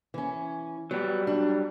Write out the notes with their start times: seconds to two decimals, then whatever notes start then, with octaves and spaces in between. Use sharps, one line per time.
0.14 E3 C#4
0.91 F#3 G3 B3
1.27 D4